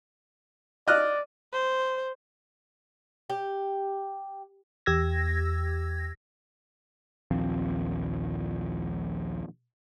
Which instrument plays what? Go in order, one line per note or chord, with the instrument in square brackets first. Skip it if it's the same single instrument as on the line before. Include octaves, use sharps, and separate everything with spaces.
[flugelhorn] D5 [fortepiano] D#5 F6 F#6
[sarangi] C5
[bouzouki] G4
[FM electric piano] E2 G4 E6 G#6 A#6
[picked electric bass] A#1 D#2 F3 C4